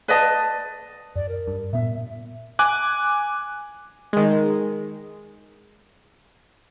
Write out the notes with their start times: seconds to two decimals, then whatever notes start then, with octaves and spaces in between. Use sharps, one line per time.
0.08 B4 D5 D#5 A5
1.16 F#2 D5
1.29 A#4
1.47 G2
1.73 A#2 B3 E5
2.59 G#5 D6 F#6
4.13 D#3 G#3